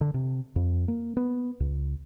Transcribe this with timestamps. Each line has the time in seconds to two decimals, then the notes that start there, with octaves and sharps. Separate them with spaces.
0.01 D3
0.14 C3
0.56 F2
0.88 A#3
1.17 B3
1.60 C#2